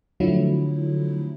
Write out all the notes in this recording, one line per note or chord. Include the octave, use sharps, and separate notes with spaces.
D3 F3 F#3 A3 E4